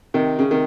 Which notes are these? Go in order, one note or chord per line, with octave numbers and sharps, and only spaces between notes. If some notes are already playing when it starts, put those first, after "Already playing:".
C3 D#3
C#3
C3 D#3